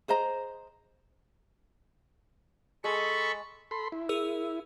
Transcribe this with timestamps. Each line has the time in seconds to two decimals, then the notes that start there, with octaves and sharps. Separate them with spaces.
0.08 G#4 C5 D#5 A#5
2.84 G#3 G#4 A4 B5 C#6
3.71 A4 B5 C6
3.92 E4
4.09 G#4 A#4 E6